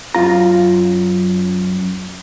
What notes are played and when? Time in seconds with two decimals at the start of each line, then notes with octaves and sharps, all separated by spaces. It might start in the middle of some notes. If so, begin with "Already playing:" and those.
0.14 F#2 F4 A#5